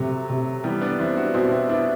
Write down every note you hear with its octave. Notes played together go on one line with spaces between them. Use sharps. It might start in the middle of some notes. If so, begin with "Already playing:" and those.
Already playing: C3 F#3 A3
C3
E3 G3 B3
B3 D4
E3 C4 E4
D4 F#4
B2 C4 E4
C4 E4
B3 D4 E4